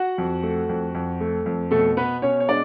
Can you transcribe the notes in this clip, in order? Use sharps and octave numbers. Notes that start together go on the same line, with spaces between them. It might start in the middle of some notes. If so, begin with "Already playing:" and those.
Already playing: F#4 F#5
F2
A3
F2
F2
A3
F2
B2 A3 A4
B2 B3 B4
B2 C#4 C#5
C#5
G#3 D4 D5